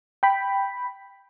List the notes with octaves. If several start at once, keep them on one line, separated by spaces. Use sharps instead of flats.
G5 B5